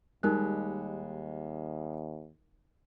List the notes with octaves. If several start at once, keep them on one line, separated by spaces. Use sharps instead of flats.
D#2 G3 G#3 D#4 A#4 F#6